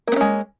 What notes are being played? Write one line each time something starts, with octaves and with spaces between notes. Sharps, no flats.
G#3 A#3 B3 C#4